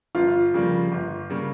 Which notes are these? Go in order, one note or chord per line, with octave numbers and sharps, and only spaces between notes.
G1 F4
F2 C#3 G3 A#3
G1
C#3 G3 A#3